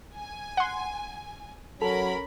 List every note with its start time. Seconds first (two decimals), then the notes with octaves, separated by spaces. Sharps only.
0.17 G#5
0.57 F#5 C6
1.82 F#3 C#4 A4 A#4 B5